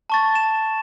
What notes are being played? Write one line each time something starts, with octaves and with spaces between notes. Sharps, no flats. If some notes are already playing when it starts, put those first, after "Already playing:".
A5 C#6 A6
E7